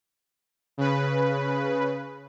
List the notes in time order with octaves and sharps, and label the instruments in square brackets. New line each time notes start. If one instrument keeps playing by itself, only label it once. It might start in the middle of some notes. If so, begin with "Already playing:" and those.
[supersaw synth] C#3 B4